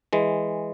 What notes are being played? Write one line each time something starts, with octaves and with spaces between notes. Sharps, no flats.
E3 G#3